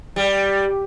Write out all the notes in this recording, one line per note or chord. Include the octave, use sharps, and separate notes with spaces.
G3